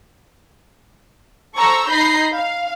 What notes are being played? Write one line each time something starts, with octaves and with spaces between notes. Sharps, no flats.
A4 C5 A#5 C#6 E6
D#4 B5 G6 A#6 C7
F5